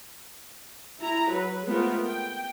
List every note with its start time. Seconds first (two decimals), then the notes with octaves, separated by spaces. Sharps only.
0.99 E4 A#5
1.29 F#3 B4
1.66 G#3 A3 B3 C4 F4 A#4
2.05 G5